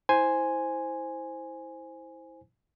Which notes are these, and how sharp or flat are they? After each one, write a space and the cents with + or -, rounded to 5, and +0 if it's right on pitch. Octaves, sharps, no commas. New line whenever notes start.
E4 -20 C5 +0 G#5 +0